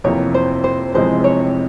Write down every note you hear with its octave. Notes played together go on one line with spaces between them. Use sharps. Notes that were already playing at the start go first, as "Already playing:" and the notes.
F2 C3 E3 A#3 C#5
C5
C5
F1 F2 C3 E3 G#3 C5
C#5